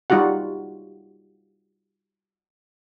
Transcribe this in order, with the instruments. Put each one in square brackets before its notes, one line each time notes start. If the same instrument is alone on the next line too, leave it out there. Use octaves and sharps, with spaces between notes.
[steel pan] G3 D#4 F4 F#4 F#5